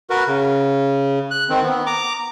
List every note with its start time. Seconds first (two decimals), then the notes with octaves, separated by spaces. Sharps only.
0.10 F#4 A#4 B4
0.27 C#3
1.31 F#6
1.49 D#3 C4
1.63 B3
1.86 A#5 D6